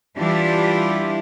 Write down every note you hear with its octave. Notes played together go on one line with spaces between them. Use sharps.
E3 G3 D4 E4 F4 G4